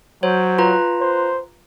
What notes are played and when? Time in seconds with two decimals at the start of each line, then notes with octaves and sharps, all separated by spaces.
0.23 F#3 C5 C#5
0.58 F4 B4 A#5
1.01 C5